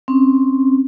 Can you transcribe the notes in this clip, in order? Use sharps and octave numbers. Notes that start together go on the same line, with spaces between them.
C4 C#4